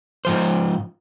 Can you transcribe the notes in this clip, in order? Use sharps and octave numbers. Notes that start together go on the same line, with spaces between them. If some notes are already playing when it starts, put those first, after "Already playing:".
G#2 F3 C5